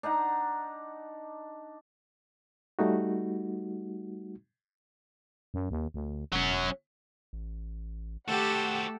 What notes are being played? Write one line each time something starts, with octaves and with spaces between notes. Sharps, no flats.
D4 D#4 F#5 A#5
G3 A3 D#4 F#4
F#2
D#2
D2
E1 F#3 C#4
A1
A3 F#4 G4 A4 C5 F#5